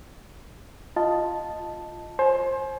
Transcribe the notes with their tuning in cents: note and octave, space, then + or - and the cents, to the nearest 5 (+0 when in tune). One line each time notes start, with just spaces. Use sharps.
F4 +0 D#5 +0 A5 +0
C5 +25 G#5 +35